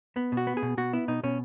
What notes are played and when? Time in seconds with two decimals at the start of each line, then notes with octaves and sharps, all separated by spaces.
0.16 B3
0.32 B2
0.37 F#4
0.47 B3
0.57 G#4
0.63 B2
0.77 B2 F#4
0.93 B3 E4
1.08 B2 D#4
1.23 B2 C#4